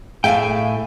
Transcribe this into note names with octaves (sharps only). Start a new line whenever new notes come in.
A2 G#4 E5 F5 G5 G#5